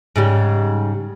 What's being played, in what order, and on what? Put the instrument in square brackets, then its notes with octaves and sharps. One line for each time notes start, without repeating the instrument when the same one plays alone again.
[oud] G#2 C#3 G3